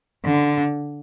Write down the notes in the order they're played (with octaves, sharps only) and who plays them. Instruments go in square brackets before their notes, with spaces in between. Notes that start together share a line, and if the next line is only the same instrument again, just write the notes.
[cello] D3